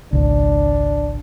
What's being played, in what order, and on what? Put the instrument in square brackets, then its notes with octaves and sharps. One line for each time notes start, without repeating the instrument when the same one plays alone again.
[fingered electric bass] G#1 C#2 [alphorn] D4